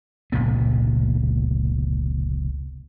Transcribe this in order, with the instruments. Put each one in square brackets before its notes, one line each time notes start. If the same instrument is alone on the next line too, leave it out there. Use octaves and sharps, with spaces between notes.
[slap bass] F1 C#2 A#2 B3